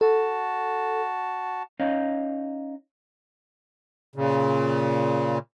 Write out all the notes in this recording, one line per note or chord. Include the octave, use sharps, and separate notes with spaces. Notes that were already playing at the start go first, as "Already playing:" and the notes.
F#4 A4 A5
C#4 D#4 C#5 D#5 F5
A#2 C#3